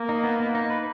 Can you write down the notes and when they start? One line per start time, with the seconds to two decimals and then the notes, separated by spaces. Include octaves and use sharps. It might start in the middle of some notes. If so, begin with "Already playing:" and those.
Already playing: A#3
0.09 D#4
0.24 B3
0.40 B3
0.55 D#4
0.70 B4